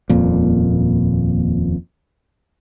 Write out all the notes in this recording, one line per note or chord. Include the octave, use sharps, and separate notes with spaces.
D#1 F2 A#2